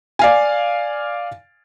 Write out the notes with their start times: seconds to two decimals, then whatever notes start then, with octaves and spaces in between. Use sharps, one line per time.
0.19 D5 F5 G#5